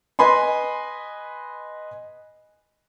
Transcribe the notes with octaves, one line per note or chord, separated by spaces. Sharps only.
B4 D#5 G#5 B5 C6